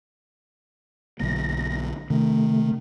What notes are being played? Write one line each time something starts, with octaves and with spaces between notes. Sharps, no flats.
B1 D3 A#3 A#6
C3 D#3 A3 D4